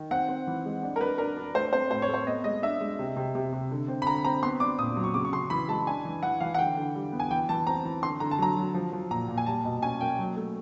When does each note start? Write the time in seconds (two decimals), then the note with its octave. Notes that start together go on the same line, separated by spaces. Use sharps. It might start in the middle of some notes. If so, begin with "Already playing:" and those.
Already playing: D#3
0.11 C4 F#5
0.29 C4
0.47 E3
0.65 G#3
0.83 D4
0.96 A#4
1.01 D4 B4
1.18 D4 A#4
1.36 D4
1.54 A3 C5
1.73 C4 C5
1.91 A2 C5
2.02 C#5
2.08 A3
2.14 C5
2.26 B3 D#5
2.44 G#3 D#5
2.62 D4 E5
2.81 G#3
2.99 C3
3.17 C3
3.35 C3
3.53 C3
3.71 D3
3.88 C4
4.02 B5
4.06 D3 A#5
4.24 C4 A#5
4.43 B3 C6
4.60 D4 D6
4.78 A#2 D#6
4.97 F#3
5.04 C#6
5.14 C#3 D6
5.25 C#6
5.33 C#3 C6
5.50 E3 B5
5.68 G#3 A5
5.87 D4 G#5
6.05 E3
6.23 E3 F#5
6.40 E3 F5
6.54 F#5
6.58 D3 G5
6.77 D3
6.95 G3
7.12 B3
7.20 G#5
7.31 E3 G5
7.49 E3 A5
7.67 C4 A#5
7.85 E3
8.02 D3 C6
8.20 D3 A#5
8.31 A5
8.38 F#3 A#5
8.56 F#3
8.74 F3
8.93 F3
9.11 A#2 A#5
9.28 A#2
9.38 G#5
9.46 G3 A5
9.65 B2
9.82 C#4 G#5
10.01 A#3 G5
10.18 F#3
10.37 A3